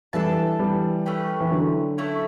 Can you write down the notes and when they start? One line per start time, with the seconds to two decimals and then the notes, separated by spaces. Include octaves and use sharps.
0.13 E3 G3 D4 A4 E5 A5
0.59 E3 G3
1.06 A3 C#4 G4 B4
1.41 E3
1.51 D3 F#3
1.98 A3 C#4 E4